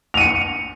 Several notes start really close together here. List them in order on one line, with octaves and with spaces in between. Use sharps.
F7 D#7 C#7